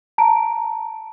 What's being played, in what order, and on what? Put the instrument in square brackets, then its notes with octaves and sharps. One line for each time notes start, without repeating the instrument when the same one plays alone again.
[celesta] A5 A#5 D7